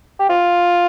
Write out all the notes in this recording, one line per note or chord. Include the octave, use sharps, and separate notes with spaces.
G4
F4